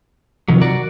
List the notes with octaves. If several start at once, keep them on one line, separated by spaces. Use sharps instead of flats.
C3 D#3 F3 F#3
F#4 A#4 D5